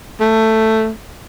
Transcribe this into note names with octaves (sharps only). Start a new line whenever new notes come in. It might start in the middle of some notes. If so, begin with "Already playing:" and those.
A3